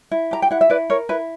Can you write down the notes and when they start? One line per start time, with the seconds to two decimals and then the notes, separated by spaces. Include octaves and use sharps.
0.11 E4
0.31 G4 A#5
0.42 G5
0.51 E4 F#5
0.61 E5
0.70 E4 B4 D5
0.90 A#4 C#5
1.09 E4 B4